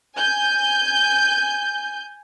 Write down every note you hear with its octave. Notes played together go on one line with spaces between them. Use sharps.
G#5 G6